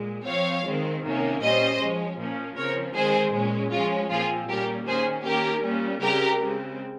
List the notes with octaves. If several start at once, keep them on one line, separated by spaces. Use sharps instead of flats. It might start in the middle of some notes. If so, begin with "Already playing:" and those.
Already playing: A#2 G#3
F3 C4 C#5 F5
D#3 G#3 C4
C3 D#3 A#3 C#4
A#2 G3 C#4 C5 D#5
F3 G#3 C#4
A#2 F3 A#3 C#4
C#3 F3 C4 A#4 C#5
D#3 G#3 C4 G#4 C5
A#2 G#3 C#4
F3 G#3 C#4 F4
A#2 F3 C4 F4 G#4
A#2 G3 A#3 C#4 G4 A#4
D#3 A#3 C#4 G#4 C5
D#3 A#3 C#4 G4 A#4
A#2 G3 C#4
C#3 G3 C4 G4 A#4
C#3 G#3 C4